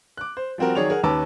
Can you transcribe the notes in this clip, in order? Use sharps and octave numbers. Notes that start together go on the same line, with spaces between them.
D6 F#6
C5
F3 G3 C4 F#4 A#4
D#3 F#3 G#4 C#5 D5 F7
G#4 A#4 F#5
D#2 C#4 B4 A5 D6 E6